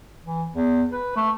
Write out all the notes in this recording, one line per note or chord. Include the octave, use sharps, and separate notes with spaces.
E3
E2
B4
A3